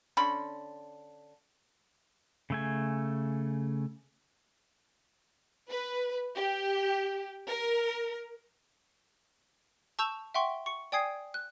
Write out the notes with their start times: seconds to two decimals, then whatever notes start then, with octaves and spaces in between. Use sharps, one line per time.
0.17 D3 C#4 B5 C6
2.50 C#3 A3 G#5
5.69 B4
6.37 G4
7.49 A#4
9.99 A5 C#6 E6 G6 E7 F7
10.34 E5 F#5 G5 C6 C#6
10.66 C#6 C#7
10.92 D5 G5 G#5 D#6 G#6 C7
11.34 F#6